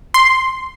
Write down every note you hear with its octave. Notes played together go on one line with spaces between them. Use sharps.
C6